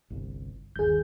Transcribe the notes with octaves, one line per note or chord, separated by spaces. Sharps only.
G1 C2
G1 D#2 G#4 G6